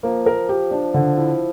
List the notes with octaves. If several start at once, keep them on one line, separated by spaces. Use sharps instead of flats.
F3 A#3
A#4
G4
D4
D3
E4